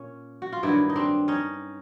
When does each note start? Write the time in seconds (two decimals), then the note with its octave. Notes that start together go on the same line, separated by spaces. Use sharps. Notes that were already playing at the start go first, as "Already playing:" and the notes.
Already playing: A#2 C#4
0.42 F#4
0.53 F4
0.63 G2 D#3 F#3 D4 E4
0.89 D#4
0.96 C4 D4
1.28 C#4 D#4